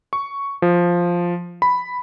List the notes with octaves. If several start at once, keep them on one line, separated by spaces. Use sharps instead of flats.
C#6
F3
B5